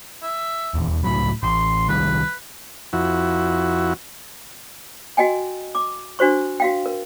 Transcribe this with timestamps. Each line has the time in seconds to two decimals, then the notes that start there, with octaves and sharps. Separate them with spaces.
0.22 E5
0.74 D#1 E2
1.04 C#2 A2 F#3 B5
1.43 A1 C6
1.89 C2 D#3 G3 B4
2.93 F2 E4 F#4
5.17 F#4 D#5 G5 G#5
5.75 D6
6.19 D4 F#4 C5 C#6
6.60 F#4 F5 G5
6.86 A#4